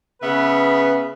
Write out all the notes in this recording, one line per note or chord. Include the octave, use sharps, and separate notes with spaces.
C#3 B3 B4 E5